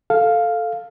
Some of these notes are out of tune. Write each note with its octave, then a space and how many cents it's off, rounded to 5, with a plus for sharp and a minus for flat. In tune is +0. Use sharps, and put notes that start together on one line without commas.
A4 +0 F5 +0